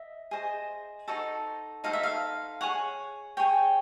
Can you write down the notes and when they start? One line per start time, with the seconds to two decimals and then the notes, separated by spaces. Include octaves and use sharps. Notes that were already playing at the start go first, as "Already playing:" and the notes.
Already playing: D#5 E5
0.31 G#4 C5 D#5
1.08 D#4 F#4 A4 C5
1.84 D#4 F#4 A4 C5 F5
1.93 E5
2.03 F5
2.61 G#4 C#5 F#5
3.37 G#4 C#5 G5